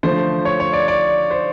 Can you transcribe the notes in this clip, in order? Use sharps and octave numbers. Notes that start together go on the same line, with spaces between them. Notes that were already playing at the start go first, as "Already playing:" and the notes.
D3 F3 A3 C5
C#5
C#5
D5
D5
C5